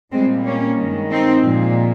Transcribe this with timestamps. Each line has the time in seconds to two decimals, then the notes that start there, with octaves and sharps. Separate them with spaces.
0.12 A#2 G3 G#3 C4
0.44 A#3 C#4
0.78 G2 D#3 G#3
1.10 C4 D#4
1.42 A#2 F3 G#3